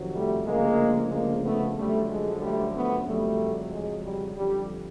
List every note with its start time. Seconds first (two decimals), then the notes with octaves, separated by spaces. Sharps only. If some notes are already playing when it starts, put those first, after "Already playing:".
Already playing: F2 C3 D#3 F#3
0.14 G3 A3
0.46 D2 C#3 F3 G#3 A#3
1.11 G#3 A#3
1.44 A3 B3
1.76 F#2 D3 F3 G3 A3
2.09 G#3
2.41 G3 A3
2.73 A3 B3
3.05 F2 C#3 F#3 G3 A3
3.71 G#3
4.03 G3
4.35 F2 D3 F3 G3